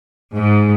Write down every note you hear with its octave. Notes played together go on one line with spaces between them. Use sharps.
G#2